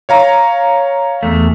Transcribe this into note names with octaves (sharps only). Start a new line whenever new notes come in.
C#5 F5 A#5
E2 A3